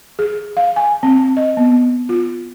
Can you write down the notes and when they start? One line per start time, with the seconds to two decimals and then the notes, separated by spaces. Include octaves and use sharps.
0.19 G#4
0.57 F5
0.76 G#5
1.03 C4
1.37 D#5
1.57 B3
2.09 F4